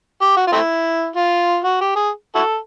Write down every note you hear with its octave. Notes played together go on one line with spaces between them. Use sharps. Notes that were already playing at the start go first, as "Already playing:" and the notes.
G4
F#4
F4
A3 C4 E4
F4
F#4
G4
G#4
E4 F#4 A4